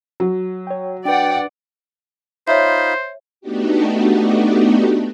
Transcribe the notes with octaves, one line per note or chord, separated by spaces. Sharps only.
F#3
C#5 G5
D4 B4 D5 F#5 G5
D#4 F4 C5 C#5 E5 B5
A3 B3 D4 D#4 F#4 G4